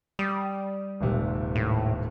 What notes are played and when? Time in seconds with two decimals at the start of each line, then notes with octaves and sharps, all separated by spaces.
0.19 G3 D#6
1.01 D#1 G#1 C3
1.55 A2